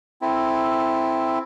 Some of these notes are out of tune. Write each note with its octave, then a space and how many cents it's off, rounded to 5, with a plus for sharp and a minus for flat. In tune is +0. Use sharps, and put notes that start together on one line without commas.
C4 +0 E4 +0 A4 +0